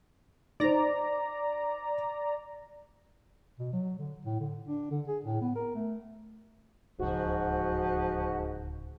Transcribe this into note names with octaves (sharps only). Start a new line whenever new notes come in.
D#4 C5 D5 A#5
B2
F#3
D3
A2
D3
D4
D3
G#4
A2
B3
A#4
A3
D1 C#2 G#2 C#3 F3 F#4